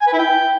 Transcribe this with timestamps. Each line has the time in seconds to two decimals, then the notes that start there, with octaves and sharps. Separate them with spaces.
0.01 G#5
0.07 B4
0.13 E4
0.19 G5